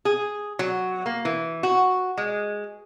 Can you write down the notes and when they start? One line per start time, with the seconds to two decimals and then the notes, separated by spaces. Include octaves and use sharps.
0.05 G#4
0.59 F#3
1.06 A#3
1.25 E3
1.63 F#4
2.17 G#3